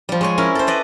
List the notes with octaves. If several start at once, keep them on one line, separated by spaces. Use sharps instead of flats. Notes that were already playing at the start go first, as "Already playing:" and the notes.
F3 G3
G#3 C#5 G#5
C#4 E4 A#4
A4 C5
B4 D5 D#5